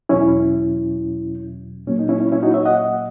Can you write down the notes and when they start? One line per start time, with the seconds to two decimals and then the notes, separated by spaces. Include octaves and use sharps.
0.09 E2 B2 F#3 C#4 E4
1.87 A#2 F#3 A#3 C#4
1.99 D#4
2.09 C#4 E4
2.21 C#4
2.32 C#4 E4
2.43 D#4 F#4
2.54 C#5 E5
2.65 D#5 F#5